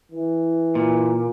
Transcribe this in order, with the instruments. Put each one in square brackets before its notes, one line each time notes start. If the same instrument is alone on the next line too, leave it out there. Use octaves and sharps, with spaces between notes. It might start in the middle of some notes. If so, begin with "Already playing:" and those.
[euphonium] E3
[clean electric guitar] A#2